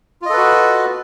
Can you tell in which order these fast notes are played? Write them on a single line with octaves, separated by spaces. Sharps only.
F4 D#5 A4 B4 F#4